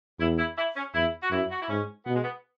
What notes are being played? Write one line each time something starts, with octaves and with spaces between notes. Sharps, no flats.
E2 E4
E4
E4
C#4
E2 E4
F#4
F#2 E4
F#4
E4
G#2 C#4
B2 B3
G#3
B3